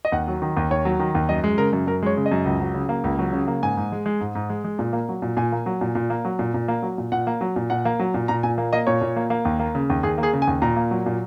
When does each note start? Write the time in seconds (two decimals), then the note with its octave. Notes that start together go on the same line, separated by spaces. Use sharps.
0.05 D#5
0.12 D#2 F#5
0.28 F#3
0.42 D#3
0.56 D#2
0.71 D#2 C#5
0.85 F#3
0.99 D#3
1.15 D#2
1.29 F#2 D#5
1.44 G#3
1.58 C#3 A#4
1.73 F#2
1.87 F#2 A#4
2.02 G#3 C#5
2.17 C#3
2.26 D#5
2.31 F#2
2.46 C#2
2.61 F#3
2.74 C#3
2.89 A#3
3.04 C#2
3.19 F#3
3.33 C#3
3.48 A#3
3.62 G#2 G#5
3.77 G#2
3.92 G#3
4.06 G#3
4.21 G#2
4.35 G#2
4.50 G#3
4.64 G#3
4.79 A#2
4.93 A#3
5.09 F#3
5.22 A#2
5.37 A#2 G#5
5.52 A#3
5.66 F#3
5.81 A#2
5.95 A#2
6.10 A#3
6.25 F#3
6.39 A#2
6.54 A#2
6.68 A#3
6.82 F#3
6.98 A#2
7.12 A#2 F#5
7.27 A#3
7.41 F#3
7.56 A#2
7.70 A#2 F#5
7.85 A#3
7.99 F#3
8.14 A#2
8.28 A#2 A#5
8.43 A#2 G#5
8.58 A#3
8.73 A#3 D#5
8.87 A#2 C#5
9.01 A#2
9.16 A#3
9.30 A#3
9.45 D#2
9.60 A#3
9.75 C#3
9.90 D#2
10.03 D#2 G#4
10.18 A#3
10.23 G#4
10.33 C#3
10.42 G#5
10.47 D#2
10.62 A#2 A#5
10.76 A#3
10.91 F#3
11.06 A#2